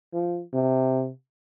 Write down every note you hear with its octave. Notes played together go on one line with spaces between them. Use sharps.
F3
C3